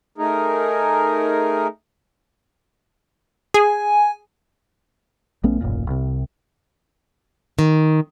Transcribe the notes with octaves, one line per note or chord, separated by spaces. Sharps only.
A3 D#4 G#4 A#4
G#4 G#5
A#1 A3 B3 C#4
D#1 A1 F#2 A#2
C2 C3
D#3